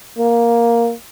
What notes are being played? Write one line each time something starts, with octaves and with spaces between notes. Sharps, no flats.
A#3